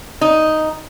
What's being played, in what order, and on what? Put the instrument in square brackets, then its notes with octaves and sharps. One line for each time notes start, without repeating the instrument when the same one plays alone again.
[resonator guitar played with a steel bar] D#4